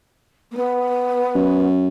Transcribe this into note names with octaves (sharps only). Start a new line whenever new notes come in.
A#3
B3
F#2